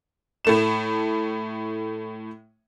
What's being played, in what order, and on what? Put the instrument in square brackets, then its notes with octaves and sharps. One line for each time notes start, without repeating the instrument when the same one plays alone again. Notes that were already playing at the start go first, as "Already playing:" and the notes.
[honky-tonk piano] A2 A3 E7